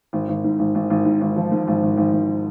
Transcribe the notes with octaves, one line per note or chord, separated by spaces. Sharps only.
G#1
G#1
G#2
G#1
G#1
G#1
G#2
G#1
F3
G#2
G#1
G#1
G#1
G#1